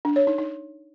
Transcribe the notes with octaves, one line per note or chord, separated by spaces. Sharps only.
D4
C#5
D#4
D#4